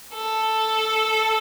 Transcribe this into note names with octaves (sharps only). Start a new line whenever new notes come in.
A4